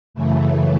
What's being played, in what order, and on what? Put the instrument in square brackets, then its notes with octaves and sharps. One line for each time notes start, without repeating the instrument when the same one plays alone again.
[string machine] F#2 C#3 E3 A3